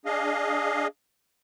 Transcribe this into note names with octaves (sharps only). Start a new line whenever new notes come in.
D4 G#4 D#5 F5